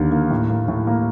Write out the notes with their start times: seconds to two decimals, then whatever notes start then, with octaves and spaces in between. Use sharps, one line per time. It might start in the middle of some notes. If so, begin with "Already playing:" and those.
Already playing: D#2 D3 A#3
0.12 A#3
0.30 A2
0.50 A#3
0.68 A2
0.87 A#3